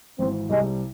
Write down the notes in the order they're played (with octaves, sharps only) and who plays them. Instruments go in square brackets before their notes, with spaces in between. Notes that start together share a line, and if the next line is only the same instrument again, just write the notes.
[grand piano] G#1 G#2 E3 [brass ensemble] C4
[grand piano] C2 C3 G3 [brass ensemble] G#3